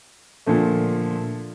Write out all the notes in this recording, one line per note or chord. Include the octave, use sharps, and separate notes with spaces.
A#2 D3 F3 A3